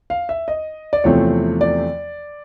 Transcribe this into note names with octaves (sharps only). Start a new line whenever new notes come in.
F5
E5
D#5
D5
E2 C3 F3 A3 C4 C#5
D5